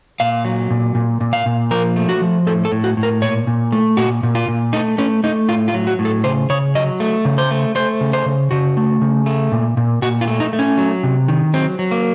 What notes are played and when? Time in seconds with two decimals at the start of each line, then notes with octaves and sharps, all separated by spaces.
0.20 A#2 F5
0.45 F#3
0.70 A#2
0.95 A#2
1.21 A#2
1.33 F5
1.46 A#2
1.71 F3 A#4
1.96 A3
2.09 F#4
2.21 F3
2.47 A2 A4
2.65 A4
2.72 A2
2.84 F#4
2.97 A2
3.03 A#4
3.22 A#2 C#5
3.47 A#2
3.72 A3
3.97 A#2 F#4
4.23 A#2
4.35 F4
4.48 A#2
4.73 A3 D#4
4.98 A3 C#4
5.24 A3 D#4
5.49 A2 F4
5.68 F4
5.74 F#3
5.87 F#4
5.99 A2
6.05 A4
6.24 C#3 C5
6.50 C#3 C#5
6.75 F#3 D#5
7.00 A3
7.25 C#3
7.38 C5
7.51 A3
7.75 A3 C5
8.01 C#3
8.13 C5
8.26 C#3
8.51 C#3 F#4
8.77 A3
9.02 C#3
9.26 A3
9.52 A#2
9.77 A#2
10.02 A#2 F#4
10.21 F4
10.27 A3
10.40 D#4
10.53 A3
10.59 C#4
10.78 F#3
11.03 C3
11.28 D#3
11.54 F#3 C4
11.79 F#3
11.91 A#3